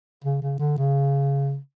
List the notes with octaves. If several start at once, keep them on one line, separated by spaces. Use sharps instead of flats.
C#3
C#3
D3
C#3